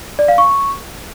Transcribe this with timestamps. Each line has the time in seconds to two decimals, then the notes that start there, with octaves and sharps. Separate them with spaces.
0.19 D5
0.28 F5
0.38 C#6